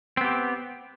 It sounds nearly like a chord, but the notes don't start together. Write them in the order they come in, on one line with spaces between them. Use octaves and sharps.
C4 B3 G4